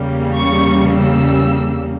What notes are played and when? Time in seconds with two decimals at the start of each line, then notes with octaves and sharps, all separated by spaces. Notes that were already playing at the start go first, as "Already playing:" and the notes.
Already playing: E2 C#3 G3 A#3
0.36 C#6
0.93 E6